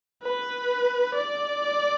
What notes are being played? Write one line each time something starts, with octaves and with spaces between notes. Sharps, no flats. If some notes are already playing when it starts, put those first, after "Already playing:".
B4
D5